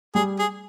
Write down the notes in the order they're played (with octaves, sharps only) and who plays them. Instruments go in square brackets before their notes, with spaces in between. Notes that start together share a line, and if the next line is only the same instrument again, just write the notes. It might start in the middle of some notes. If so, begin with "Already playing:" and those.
[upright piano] G3 [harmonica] G#4
[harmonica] G#4